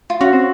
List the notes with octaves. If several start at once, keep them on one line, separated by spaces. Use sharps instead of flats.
F4
C#4 F#4
C4